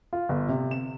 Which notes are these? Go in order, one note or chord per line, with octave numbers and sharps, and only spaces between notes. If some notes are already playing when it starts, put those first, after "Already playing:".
F4
G1
C3
E7